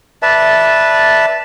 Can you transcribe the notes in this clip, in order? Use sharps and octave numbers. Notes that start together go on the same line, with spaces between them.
B4 D5 E5 A5